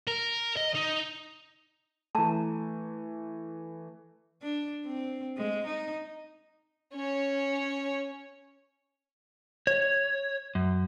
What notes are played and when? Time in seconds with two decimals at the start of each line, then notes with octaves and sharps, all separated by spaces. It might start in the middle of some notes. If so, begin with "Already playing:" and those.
0.07 A#4
0.57 D#5
0.75 D#4
2.15 E3 A3 A5 A#5
4.42 D4
4.86 C4
5.37 G#3
5.66 D#4
6.94 C#4 C#5
9.67 C#5
10.55 F#2